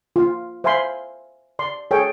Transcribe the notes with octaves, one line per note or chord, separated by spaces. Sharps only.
F4 F5
C5 E5 F5 G#5 B5 C6
D5 C6
G#4 A4 C#5 G5